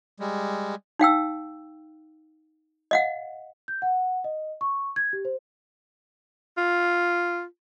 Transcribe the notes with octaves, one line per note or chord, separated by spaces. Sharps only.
G3 G#3
D#4 F5 G5 E6
D#5 F5 F#5
G6
F#5
D#5
C#6
G#6
G4
C5
F4